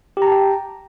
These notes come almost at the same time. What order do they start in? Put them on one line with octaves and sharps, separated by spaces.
G4 A#5 A5 G5